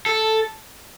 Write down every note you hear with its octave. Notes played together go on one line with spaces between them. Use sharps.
A4